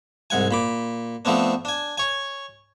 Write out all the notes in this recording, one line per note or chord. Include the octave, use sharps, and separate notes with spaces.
C2 G#2 F#5 G#5
A#2 B5 D6
F3 A3 B3 C4 D4
D4 G#5
C#5 G#5